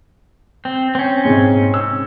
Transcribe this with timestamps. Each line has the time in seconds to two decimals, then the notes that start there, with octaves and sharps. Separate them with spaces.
0.65 C4
0.95 C4 C#4
1.25 G#2 C3
1.74 E6